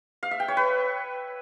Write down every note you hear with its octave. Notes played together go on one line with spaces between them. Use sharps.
F5
E5
G5
C#5
B4